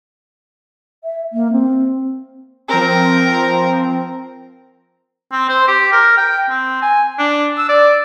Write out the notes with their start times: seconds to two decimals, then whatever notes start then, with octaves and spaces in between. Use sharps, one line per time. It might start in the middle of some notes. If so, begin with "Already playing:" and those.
1.04 E5
1.33 A#3
1.52 C4
2.69 F3 C4 A#4
5.32 C4
5.49 C5
5.68 G4
5.92 A#4
6.17 G5
6.50 C4
6.82 G#5
7.19 D4
7.58 E6
7.69 D5